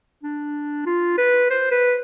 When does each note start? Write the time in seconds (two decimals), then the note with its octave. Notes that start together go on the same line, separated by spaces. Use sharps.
0.23 D4
0.86 F4
1.18 B4
1.50 C5
1.72 B4